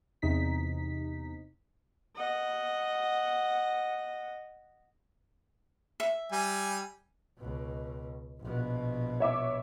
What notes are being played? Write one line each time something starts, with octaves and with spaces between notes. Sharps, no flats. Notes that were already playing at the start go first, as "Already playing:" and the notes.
E2 C3 D#4 B6
D#5 F#5
E5
G3 G#5
C#2 B2
A#1 B2
C#5 E5 D6